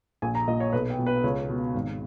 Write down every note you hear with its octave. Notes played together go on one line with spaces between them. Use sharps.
A#1 G#5
A#5
A#2 D#5
C#5
B1 B4
G5
B2
B4
C#2 C#5
B2
G#1